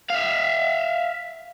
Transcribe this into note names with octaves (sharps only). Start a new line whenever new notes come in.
E5 F5